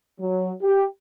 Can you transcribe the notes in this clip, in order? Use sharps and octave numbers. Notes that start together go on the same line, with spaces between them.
F#3
G4